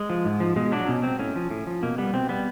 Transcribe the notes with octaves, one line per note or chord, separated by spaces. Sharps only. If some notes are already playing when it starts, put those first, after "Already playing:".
Already playing: G#3
F3
G#2
F3
B2 G#3
F#3 D4
B2 C#4
F#3 C4
A2 C#4
F3
A2
F3
B2 A#3
G3 B3
B2 C4
G3 B3